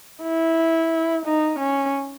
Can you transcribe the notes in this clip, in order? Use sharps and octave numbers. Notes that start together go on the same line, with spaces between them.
E4
D#4
C#4